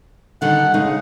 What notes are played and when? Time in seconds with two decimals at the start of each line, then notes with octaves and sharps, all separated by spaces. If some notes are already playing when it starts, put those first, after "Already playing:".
0.42 D3 D#3 G3 F#5
0.74 C#3 G#3 D#4